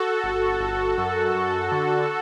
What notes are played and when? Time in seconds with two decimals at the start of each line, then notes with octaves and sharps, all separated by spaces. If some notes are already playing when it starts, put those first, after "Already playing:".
Already playing: F#4 A4
0.24 G1
0.60 G1
0.98 F#2
1.35 F#2
1.72 D3